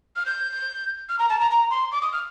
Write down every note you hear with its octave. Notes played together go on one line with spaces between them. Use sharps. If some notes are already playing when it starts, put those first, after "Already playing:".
F6
G6
F6
A#5
A5
A#5
A#5
C6
D6
D#6
F6